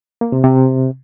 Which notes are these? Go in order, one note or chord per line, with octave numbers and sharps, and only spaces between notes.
A#3
C3
C3